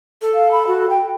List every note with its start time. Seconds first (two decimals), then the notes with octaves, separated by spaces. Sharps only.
0.22 A4
0.34 F5
0.51 B5
0.67 F#4
0.89 G5